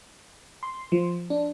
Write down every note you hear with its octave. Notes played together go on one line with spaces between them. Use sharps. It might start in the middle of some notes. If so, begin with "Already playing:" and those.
C6
F3
D4